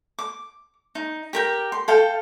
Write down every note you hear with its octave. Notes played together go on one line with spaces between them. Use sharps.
D6
D#4
G4 A#4 G5
C6
A4 F5 G5